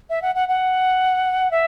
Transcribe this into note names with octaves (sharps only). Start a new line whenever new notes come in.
E5
F#5
F#5
F#5
E5